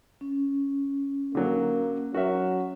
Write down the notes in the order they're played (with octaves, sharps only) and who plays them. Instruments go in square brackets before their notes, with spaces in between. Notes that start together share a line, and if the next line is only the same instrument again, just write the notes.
[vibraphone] C#4
[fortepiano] D3 F#3 [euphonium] A#3
[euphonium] F#3 [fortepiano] F#4 A#4 E5